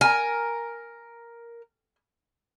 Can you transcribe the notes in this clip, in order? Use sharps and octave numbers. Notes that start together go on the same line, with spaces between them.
A#4 G#5